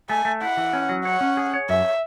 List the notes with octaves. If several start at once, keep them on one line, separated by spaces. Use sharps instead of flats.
A3 G#5
A3
E4 F#5
E3
C#4
F#3
C#5 F#5
C#4
G#4
C#5
F#2 E5